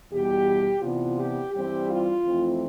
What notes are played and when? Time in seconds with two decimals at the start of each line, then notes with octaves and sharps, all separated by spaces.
0.11 E2 B2 G3 G4
0.81 C3 E3 B3 D4 F4
1.18 G4
1.53 G2 E3 G3 C4 G4
1.88 F4
2.23 F2 E3 A3 C4